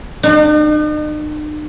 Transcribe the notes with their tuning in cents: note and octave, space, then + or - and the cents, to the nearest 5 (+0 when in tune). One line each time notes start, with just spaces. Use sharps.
D#4 -45